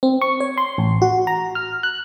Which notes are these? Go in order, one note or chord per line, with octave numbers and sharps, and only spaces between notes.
C4
C#6
C#5
C6
A1
F#4
A#5
F6
F#6